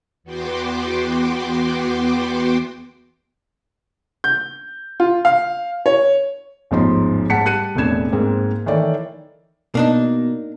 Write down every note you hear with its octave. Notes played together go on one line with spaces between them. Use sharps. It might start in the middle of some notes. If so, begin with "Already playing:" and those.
E2 B3 F#4 G5 C6 D6
G6
F4
F5
C#5
A1 E2 G#2 F3 D#4 C6
G#2 F#5 A5 B6 C#7
G3 A5 F#6 C#7 D#7
E1 F2 A2 D4 G#6 E7
G#2 G#3 A#3 C4
D#3 E3 A4 C#5 D5
B2 A#3 D4 D#4